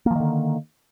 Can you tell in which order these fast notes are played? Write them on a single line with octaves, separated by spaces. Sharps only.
A#3 F3 D#3 D3